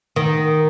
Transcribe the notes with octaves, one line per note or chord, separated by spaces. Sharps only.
D#3